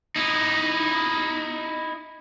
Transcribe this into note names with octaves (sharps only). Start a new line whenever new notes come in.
D#4 E4